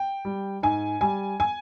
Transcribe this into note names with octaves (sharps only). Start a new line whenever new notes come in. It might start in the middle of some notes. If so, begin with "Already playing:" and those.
Already playing: G5
G3
G#2 G#5
G3 G#5
G#5